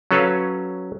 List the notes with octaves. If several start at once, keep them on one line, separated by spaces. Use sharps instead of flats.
F#3 C#4 A4 B4 C#5 F5